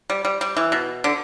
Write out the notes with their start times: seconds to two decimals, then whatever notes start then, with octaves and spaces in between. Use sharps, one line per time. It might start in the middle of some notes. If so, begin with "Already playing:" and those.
0.10 G3
0.25 G3
0.41 G3
0.57 E3
0.72 B2
1.04 D3